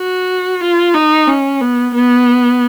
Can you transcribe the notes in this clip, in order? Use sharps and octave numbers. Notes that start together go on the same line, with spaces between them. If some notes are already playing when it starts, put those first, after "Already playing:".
Already playing: F#4
F4
D#4
C#4
B3
B3